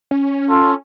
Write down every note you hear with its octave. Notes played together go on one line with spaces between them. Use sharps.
C#4
F4 A4